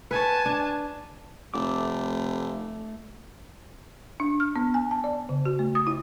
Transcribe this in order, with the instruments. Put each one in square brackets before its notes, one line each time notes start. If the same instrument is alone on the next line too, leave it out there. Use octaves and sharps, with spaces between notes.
[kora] B4 C#5 [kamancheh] G#5 A5
[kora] D4
[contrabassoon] F1 [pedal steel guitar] A3 D6
[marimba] D4
F6
B3
G#5
A5
D5
C#3
F#4
A3
D#6
E4